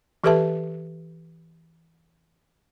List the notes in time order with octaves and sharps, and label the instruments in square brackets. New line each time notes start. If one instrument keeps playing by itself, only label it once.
[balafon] E3 G4 A4 B4 E5 A5